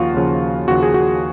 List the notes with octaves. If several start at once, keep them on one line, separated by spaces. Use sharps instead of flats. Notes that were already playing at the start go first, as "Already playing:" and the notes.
Already playing: D#2 C#3 F3 F4 F#4
D#2 C#3 F3
D#2 C#3 F3 F#4
G#4
F#4